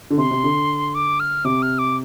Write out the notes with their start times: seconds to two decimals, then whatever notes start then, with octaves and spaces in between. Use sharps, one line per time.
0.10 D3
0.18 C3 C6
0.31 C3
0.44 D3
0.94 D6
1.20 F6
1.45 C3 D6
1.62 F6
1.78 D6